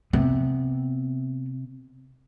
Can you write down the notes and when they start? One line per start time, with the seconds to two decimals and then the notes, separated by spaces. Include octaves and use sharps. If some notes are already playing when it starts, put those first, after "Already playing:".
0.13 C3 B3